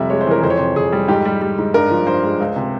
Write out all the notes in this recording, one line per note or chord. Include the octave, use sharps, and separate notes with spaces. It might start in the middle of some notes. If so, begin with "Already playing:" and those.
Already playing: F2 C3 G3 E5
G#3 C#5
C5
E3 A#4
F2 C5
C#5
C3 C5
F2 G#4
G3
G#2 G4
G3
G3
G#2
G2 A#4
F3
G2 C5
G#3
C#2
C3